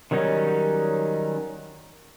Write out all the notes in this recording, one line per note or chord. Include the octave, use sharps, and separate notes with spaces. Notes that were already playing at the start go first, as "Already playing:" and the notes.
D#3 F#3 G3 C#4 D#4